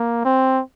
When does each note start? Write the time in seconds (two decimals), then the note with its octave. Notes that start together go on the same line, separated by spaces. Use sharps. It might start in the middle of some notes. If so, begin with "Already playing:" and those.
Already playing: A#3
0.25 C4